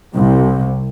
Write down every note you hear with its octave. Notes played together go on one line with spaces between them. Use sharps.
C2 C3